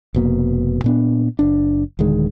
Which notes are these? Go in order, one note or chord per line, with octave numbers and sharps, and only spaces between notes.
F1 B2 A#3
A#2 B3 D4
F#1 D4
D#1 D3 D#3 G#3